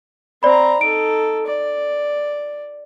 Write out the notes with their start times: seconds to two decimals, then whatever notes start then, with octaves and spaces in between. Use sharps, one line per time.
0.43 C4 C5 D5 A#5 B5
0.81 D#4 A4 D7
1.46 D5